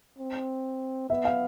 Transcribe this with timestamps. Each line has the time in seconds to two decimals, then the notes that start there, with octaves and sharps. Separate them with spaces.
0.18 C4
1.09 B3 E5
1.25 F5